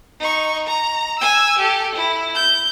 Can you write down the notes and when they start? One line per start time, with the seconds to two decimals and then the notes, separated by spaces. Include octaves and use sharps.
0.20 D#4 C#6
0.67 A#5
1.19 G#5 E6
1.58 G4 A4
1.95 E4
2.35 G6